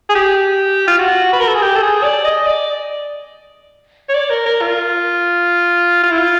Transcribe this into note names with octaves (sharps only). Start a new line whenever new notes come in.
G#4
G4
F4
F#4
B4
A#4
A4
G#4
G4
A4
G#4
D5
D#5
D5
C#5
D5
A#4
A#4
F4
F4
E4
F4